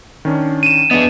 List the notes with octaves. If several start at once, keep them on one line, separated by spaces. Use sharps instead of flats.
D#3 C#4 D4
D#7 E7
B3 D4 G#4 D#5